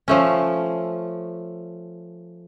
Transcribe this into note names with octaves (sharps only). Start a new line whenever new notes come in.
F3 A3 C#4